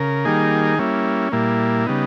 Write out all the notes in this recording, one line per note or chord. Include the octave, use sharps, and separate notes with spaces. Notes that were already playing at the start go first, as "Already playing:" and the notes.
Already playing: C#3 A#4
D#3 G3 A#3 D#4 G#4
G3 A#3 C#4 E4
A#2 G3 A#3 E4
C#3 G3 B3 D#4